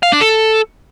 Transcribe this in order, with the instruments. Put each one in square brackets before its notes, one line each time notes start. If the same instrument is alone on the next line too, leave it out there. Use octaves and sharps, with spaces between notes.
[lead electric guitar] F5
D4
A4